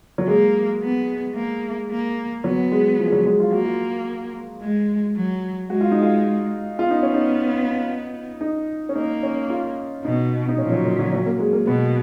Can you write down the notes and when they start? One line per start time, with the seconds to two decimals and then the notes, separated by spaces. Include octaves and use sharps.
0.18 F#3
0.27 G#3 A#3
0.82 B3
1.36 A#3
1.91 A#3
2.44 F#3 B3
2.72 G#3
2.99 F3
3.07 G#3
3.12 F#3
3.26 G#3
3.40 F4
3.52 A#3 F#4
3.65 F4
4.62 G#3
5.16 F#3
5.69 G#3 F#4
5.81 F4
5.91 D#4
6.02 F4
6.78 B3 F4
6.90 D#4
7.03 C#4
7.14 D#4
8.41 D#4
8.89 C#4
8.95 A#3 D#4
9.23 C#4
9.50 F4
10.04 B2 D#4
10.48 D#4
10.58 A#2 C#4
10.66 F3
10.72 F#3
10.85 F#3
10.99 F#3
11.13 F#3
11.26 A#3
11.39 G#3
11.53 A#3
11.66 B2 B3